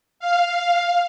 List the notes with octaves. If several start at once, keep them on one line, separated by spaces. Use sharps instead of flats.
F5